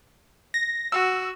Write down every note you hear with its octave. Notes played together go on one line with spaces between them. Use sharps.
A#6
F#4 E6